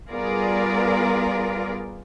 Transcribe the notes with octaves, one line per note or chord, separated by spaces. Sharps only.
G3 B3 F4 G#4 A#4 D5